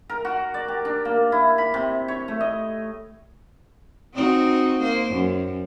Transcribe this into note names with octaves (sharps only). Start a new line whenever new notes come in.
A#4
F#4
D5
G4
D4
A#3
E4
B5
C3
C#5
A3
D#5
C4 D#4 F#4
A#3 C5
F#2